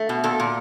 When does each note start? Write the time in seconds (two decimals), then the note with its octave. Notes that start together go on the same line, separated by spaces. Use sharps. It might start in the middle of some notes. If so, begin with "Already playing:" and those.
Already playing: A3
0.09 B2
0.24 A#2 A4
0.40 A#2